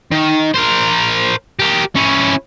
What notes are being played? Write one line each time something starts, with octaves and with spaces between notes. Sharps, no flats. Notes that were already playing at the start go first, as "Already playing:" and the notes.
D#3
A#4 C5
G4 A#4
C#4 E4